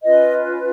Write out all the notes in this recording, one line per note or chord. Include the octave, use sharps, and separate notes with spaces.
C#4 F4 B4 D#5